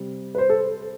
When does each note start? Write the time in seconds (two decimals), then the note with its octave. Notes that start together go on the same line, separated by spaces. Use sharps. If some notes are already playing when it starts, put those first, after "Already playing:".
Already playing: C3 G3
0.35 B4
0.38 C5
0.50 A4